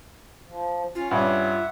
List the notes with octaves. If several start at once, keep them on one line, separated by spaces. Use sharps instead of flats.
F3
C#4 F4
G2 C#4 E5 F#5